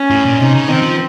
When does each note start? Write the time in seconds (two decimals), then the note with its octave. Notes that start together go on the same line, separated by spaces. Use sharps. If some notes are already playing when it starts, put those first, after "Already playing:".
Already playing: C#4
0.11 A2
0.25 A#2
0.40 C3 D#4
0.55 C#3
0.68 D#3 C4
0.82 F3